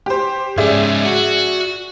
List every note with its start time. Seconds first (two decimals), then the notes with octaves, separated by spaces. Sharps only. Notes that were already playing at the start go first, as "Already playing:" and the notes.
0.06 G4 C5
0.58 G#2 C#4 G#4 D5 E5
1.06 F#4